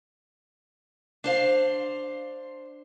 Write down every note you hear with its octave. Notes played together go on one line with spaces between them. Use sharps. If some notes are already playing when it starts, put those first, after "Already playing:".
D4 C5 F5